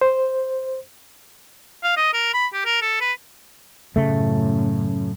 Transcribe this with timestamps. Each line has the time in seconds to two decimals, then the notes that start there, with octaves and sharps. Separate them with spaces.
0.01 C5
1.83 F5
1.96 D#5
2.14 A#4
2.34 B5
2.54 G4
2.65 A#4
2.82 A4
3.01 B4
3.96 F#2 A2 C#3 A3